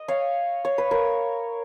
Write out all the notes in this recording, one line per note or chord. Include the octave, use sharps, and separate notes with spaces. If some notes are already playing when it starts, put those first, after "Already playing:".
Already playing: D#5
C#5 F5
C#5
B4
A#4 C#5